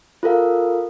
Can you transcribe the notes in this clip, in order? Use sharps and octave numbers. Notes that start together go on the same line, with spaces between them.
F4 A4 A#4 F5